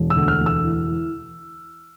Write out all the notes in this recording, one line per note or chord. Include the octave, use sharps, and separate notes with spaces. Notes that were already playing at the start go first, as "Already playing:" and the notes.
Already playing: E1
E6
D2
F6
E1
E6
E3
E3